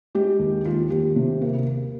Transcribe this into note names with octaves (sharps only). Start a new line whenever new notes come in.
G#3 G4
D#2
D#2 F4
D#2 G4
C3
A#3
A#3